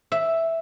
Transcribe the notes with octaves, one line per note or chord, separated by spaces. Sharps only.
E5